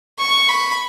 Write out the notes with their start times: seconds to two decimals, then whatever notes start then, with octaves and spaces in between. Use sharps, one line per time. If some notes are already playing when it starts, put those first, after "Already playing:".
0.19 C#6
0.49 B5